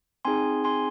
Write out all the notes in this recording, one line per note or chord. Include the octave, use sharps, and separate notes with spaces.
C4 D#4 G#4 G#5 C6
G#5 C6